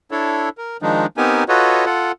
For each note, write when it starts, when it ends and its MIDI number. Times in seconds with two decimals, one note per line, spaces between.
0.11 0.49 62
0.11 0.49 64
0.11 0.49 69
0.11 0.49 73
0.58 0.77 70
0.82 1.06 51
0.82 1.06 53
0.82 1.06 56
0.82 1.06 62
0.82 1.06 63
1.17 1.44 59
1.17 1.44 60
1.17 1.44 63
1.17 1.44 67
1.17 1.44 70
1.17 1.44 80
1.49 1.85 65
1.49 1.85 66
1.49 1.85 69
1.49 1.85 71
1.49 1.85 73
1.49 1.85 75
1.86 2.12 65
1.86 2.12 69
1.86 2.12 78